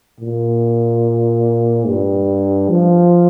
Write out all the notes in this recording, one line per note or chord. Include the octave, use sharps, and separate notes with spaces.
A#2
G2
F3